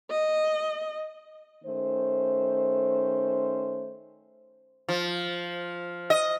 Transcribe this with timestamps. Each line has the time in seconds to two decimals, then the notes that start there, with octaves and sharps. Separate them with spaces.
0.11 D#5
1.64 D#3 A3 C#4 C5
4.89 F3
6.10 D#5